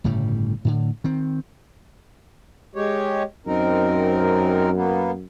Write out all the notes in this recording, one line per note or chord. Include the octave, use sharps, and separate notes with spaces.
G1 A2 C#3 G3
A2 D3
D#3 C4
G#3 G4 C#5
F#2 C4 D#4 A#4
A#3 B3